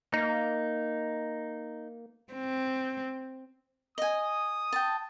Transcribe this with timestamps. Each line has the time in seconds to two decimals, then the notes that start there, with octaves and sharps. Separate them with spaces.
0.14 A#3 D#4
2.33 C4
3.98 D#5 G#5 D#6
4.73 G5 A5